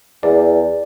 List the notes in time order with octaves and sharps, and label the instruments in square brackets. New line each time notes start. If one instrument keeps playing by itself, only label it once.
[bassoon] E2 [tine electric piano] D5